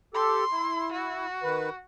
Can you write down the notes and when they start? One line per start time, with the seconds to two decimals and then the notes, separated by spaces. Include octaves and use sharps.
0.14 G4 A4 C6
0.52 E4
0.92 F#4
1.43 D#3 B4